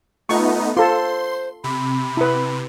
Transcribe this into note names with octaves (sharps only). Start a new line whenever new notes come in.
A3 B3 D#4 F4 C#6
F4 A4 C5 C6
C3 B5
E4 B4